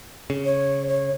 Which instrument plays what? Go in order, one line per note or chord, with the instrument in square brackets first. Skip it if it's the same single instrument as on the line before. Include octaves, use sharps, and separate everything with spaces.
[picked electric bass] C#3
[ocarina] C#5
C#5